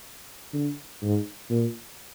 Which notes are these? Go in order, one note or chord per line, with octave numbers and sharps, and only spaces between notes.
D3
G#2
A#2